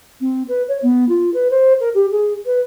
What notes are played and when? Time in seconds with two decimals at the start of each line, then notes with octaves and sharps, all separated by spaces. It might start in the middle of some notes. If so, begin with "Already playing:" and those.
0.21 C4
0.48 B4
0.68 C#5
0.82 B3
1.09 F4
1.34 B4
1.50 C5
1.80 A#4
1.94 G4
2.11 G#4
2.46 B4